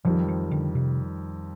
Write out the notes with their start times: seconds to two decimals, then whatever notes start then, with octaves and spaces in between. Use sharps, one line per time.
0.05 F2 D#3 F3 G3
0.28 F3
0.51 D3
0.75 C3